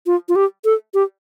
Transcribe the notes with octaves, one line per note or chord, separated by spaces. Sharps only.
F4
F4
G4
A4
G4